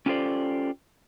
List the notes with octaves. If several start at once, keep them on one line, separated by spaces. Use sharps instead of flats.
C#4 F4 G4 A4 C5 D5